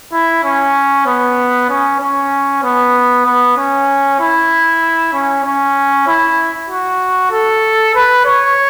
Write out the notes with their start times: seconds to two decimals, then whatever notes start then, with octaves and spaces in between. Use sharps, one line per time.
0.13 E4
0.44 C#4
1.06 B3
1.69 C#4
2.00 C#4
2.63 B3
3.25 B3
3.57 C#4
4.19 E4
5.13 C#4
5.45 C#4
6.07 E4
6.69 F#4
7.31 A4
7.95 B4
8.25 C#5